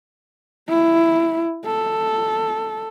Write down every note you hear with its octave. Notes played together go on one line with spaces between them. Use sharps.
E4
A4